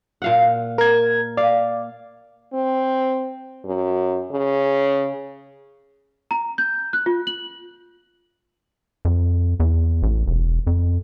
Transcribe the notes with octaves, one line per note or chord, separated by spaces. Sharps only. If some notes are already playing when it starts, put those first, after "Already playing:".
A#2 F5 F#5
A#4 G#6
D5 F5
C4
F#2
C#3
A#5
G6
F#6
F4
F#7
F2
E2
A1
E1
F2